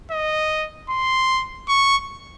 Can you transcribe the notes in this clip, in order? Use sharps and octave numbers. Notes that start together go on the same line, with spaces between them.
D#5
C6
C#6